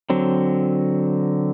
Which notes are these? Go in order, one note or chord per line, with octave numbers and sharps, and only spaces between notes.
D3 F#3 C4